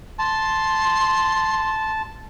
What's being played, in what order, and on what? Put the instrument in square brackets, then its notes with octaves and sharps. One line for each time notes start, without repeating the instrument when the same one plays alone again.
[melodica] A5 [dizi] C6